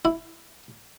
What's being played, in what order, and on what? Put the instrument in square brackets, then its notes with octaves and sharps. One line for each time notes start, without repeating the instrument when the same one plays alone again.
[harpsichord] E4